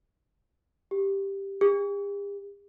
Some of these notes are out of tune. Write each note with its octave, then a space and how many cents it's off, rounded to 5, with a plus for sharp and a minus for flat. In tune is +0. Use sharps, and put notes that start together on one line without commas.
G4 +5
G4 +45